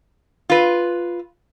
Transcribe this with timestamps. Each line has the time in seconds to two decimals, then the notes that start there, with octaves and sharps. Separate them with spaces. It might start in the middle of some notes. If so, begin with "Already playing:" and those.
0.50 F4 B4